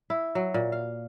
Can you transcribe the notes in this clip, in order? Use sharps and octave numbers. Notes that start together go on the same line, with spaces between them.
E4
F#3
A#2
F5